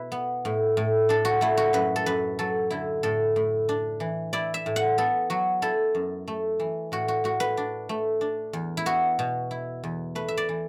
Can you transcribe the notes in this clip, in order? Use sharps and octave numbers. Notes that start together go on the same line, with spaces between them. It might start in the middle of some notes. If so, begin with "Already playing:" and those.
Already playing: B2 E4 B4
B3
A2
A2
D4 A4
F#4
A3 E4
F#4
F#2 B4
A4
F#2 B4
F#3 A4
D3 E4
A2 A4
A2
D4
E3
E4 D5
E5
A2
F#5
B3 A4
F#3 F#4
E4 A4
F#2
A3
E3
A2 F#4
F#4
A2 F#4
B4
D4
A3
D4
E2
E4
B3 F#4
B2
E4
E2
A3 B4
E5
D5
E3